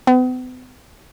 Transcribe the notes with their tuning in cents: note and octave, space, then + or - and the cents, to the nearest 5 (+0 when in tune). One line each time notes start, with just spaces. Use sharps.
B3 +45